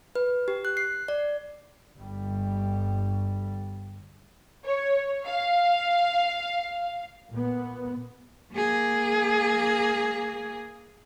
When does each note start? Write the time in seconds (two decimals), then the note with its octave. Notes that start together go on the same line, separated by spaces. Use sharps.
0.15 B4
0.48 G4
0.65 F#6
0.77 C7
1.08 D5
1.99 G1 G3
4.65 C#5
5.25 F5
7.30 A#2 B3
8.54 A#3 G#4